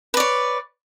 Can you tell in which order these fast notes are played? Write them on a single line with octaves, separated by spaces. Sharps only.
B4 D5 C#5